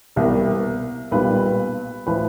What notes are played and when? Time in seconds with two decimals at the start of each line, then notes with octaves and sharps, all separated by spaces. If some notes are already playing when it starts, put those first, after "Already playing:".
0.16 C2 B2 G3 A#3 A#4
1.11 B1 A#2 G3 B4
2.07 A2 F3 B4